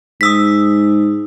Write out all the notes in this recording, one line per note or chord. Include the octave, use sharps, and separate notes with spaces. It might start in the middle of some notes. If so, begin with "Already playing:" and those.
G#2 D#6 E6 B6